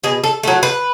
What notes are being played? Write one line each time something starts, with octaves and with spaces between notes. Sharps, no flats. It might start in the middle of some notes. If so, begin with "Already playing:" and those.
B2 G#4
A4
F#3 A3
B4